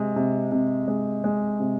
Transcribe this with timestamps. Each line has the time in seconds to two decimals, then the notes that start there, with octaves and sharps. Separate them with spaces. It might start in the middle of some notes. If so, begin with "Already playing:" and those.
Already playing: C3 G#3
0.16 C3
0.52 C3
0.88 G#3
1.24 G#3
1.60 C3